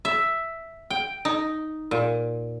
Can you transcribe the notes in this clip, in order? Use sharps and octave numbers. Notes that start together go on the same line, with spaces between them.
E5
G5
D#4
A#2